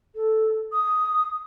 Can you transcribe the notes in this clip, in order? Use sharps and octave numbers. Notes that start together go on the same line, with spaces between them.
A4
D#6